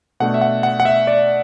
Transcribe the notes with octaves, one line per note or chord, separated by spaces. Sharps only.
B2 A3 D4 F#5
E5
F#5
F#5
F#5
E5
D5